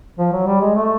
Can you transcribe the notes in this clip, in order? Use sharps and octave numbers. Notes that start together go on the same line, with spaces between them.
F3
F#3
G3
G#3
A3